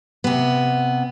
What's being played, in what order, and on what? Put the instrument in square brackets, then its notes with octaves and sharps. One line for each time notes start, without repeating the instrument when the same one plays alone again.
[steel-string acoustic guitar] C3 B3